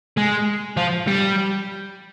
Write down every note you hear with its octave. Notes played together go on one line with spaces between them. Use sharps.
G#3
F3
G3